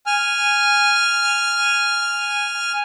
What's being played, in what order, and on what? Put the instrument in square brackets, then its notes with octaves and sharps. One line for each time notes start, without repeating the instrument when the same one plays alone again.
[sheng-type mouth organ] G#5 F6